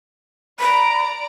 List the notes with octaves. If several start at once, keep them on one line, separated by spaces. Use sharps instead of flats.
D5 A#5 B5 D7